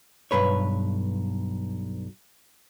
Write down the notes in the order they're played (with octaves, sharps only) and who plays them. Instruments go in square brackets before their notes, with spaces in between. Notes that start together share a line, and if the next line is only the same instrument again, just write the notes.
[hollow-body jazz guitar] B1 G2 B4 C#5